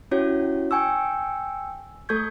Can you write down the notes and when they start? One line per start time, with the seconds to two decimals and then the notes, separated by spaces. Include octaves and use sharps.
0.11 C#4 E4 F#4 G4 C#5
0.71 G5 G#5 C#6 E6
2.09 A3 A4 C#6 G6 G#6